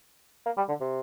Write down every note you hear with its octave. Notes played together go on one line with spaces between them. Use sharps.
A#3
G3
D3
C3